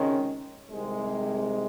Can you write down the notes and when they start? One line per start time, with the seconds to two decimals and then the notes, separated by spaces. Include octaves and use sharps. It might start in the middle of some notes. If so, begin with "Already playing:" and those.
Already playing: C#2 C3 D#3 G#3 C#4
0.71 C2 C3 D#3 G#3